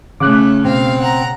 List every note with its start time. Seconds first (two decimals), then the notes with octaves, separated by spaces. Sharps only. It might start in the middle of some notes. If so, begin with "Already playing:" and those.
0.20 C#3 A3 C#4 D6 F#6
0.65 B2 C4 F5
1.00 F#5 A#5